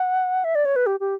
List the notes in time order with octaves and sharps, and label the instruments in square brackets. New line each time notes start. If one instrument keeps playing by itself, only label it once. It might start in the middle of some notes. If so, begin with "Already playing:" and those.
Already playing: [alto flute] F#5
E5
D5
C#5
B4
G4
G4